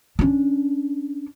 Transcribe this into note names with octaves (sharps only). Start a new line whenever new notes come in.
C#4 D4